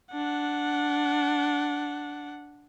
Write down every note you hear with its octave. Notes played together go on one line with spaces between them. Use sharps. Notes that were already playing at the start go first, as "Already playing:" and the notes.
D4 F#5